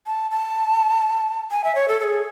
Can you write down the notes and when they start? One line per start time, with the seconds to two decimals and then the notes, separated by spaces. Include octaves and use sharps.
0.07 A5
0.31 A5
1.51 G#5
1.64 E5
1.75 C#5
1.88 A4
2.00 A4
2.04 G#4